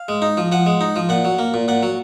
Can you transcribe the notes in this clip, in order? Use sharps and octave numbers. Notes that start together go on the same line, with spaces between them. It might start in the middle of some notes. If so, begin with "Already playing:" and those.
Already playing: F5
G#3
D#4
F3
F3 F#5
G#3
D#4
F3
A#2 F#5
F#3
A#3
A#2
A#2 F#5
F#3